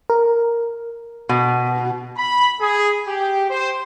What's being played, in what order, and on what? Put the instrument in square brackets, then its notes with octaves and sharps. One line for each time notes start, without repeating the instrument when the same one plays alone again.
[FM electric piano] A#4
[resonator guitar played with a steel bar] B2
[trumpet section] B5
G#4
G4
C5